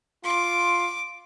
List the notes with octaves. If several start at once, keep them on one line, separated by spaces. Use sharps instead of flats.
F4 C6 D6